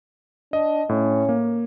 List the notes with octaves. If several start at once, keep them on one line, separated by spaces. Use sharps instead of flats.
D4 D#5
A2 C#4
A#3